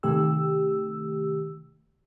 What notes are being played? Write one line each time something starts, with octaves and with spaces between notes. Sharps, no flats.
C3 D#3 A3 G4 E6